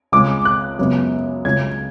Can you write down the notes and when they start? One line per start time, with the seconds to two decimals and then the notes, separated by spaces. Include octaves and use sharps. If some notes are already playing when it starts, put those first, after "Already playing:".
0.12 C#2 C#3 G#3 C#4 D6
0.45 F#6
0.79 F#2 C#3 G#3 B3
1.45 C#2 C#3 G#3 C#4 G#6